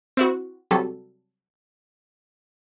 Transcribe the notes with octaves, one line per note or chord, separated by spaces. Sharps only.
C4 E4 F#4
C3 F#3 G3 A4